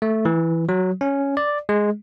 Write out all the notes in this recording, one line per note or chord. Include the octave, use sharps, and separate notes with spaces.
A3
E3
F#3
C#4
D5
G#3